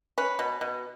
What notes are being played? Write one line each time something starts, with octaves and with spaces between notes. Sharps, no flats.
C#4 B4
B2
B2